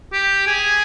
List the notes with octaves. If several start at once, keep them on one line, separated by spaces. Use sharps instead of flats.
G4
G#4